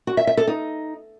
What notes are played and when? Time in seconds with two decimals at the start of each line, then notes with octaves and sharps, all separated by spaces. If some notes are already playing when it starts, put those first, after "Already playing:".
0.07 F#4
0.17 E5
0.27 E5
0.37 A4
0.47 D#4